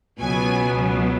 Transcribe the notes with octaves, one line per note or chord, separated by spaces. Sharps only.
C#2 B2 F#3 B3 G#5